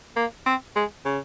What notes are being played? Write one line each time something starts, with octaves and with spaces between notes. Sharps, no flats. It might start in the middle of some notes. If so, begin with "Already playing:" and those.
A#3
C4
G#3
C#3